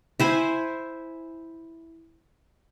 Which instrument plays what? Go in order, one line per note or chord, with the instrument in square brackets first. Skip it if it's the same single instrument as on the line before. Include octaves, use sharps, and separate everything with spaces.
[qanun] E4 C5 G#5